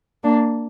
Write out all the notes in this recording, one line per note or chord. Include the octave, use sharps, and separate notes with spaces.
A#3 D4